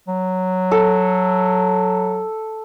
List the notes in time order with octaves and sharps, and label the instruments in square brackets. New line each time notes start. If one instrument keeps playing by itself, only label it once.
[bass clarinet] F#3
[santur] A4